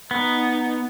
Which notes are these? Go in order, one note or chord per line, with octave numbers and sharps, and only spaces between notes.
B3 D#4